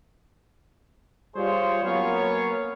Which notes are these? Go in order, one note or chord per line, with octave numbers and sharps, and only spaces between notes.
G3 F4 G#4 C5 C#5
F#3 A#3 B3 C#4 C#5 F5